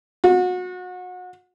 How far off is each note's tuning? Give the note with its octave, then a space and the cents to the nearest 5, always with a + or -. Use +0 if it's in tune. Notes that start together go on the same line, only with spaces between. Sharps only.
F#4 -30